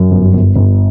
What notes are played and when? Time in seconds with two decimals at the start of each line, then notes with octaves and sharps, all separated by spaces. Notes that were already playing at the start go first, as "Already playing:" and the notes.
Already playing: F#2
0.11 G1
0.33 G1
0.56 G1